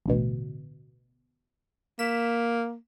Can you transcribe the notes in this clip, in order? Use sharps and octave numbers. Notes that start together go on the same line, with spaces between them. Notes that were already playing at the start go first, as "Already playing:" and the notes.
A1 D2 B2
A#3 B6 E7